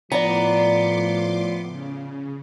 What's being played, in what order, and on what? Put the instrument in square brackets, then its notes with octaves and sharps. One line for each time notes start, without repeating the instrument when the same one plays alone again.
[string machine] A2 C6 D6 [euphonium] F3 [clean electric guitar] B3 [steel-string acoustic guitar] D5 A#5
[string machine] C#3